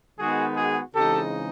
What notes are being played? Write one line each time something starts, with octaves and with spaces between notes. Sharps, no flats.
D#3 G#3 B3 D#4 F#4 G#4
F#4 G#4
C#3 E3 G#3 C4 D#4 G4 A4